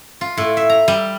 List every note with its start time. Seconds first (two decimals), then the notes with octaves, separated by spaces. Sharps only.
0.21 F4
0.37 A2
0.57 E5
0.70 A#5
0.88 G3